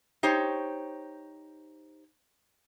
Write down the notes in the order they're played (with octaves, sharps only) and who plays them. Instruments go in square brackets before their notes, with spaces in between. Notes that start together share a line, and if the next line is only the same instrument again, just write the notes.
[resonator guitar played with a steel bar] D#4 G4 C5 C#5